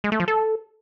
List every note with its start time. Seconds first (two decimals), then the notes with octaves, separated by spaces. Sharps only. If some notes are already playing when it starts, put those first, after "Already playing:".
0.04 G#3
0.12 A3
0.20 F3
0.28 A4